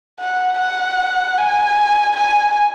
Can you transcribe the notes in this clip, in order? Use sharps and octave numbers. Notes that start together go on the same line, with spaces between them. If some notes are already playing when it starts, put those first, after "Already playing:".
F#5
F#5
G#5
G#5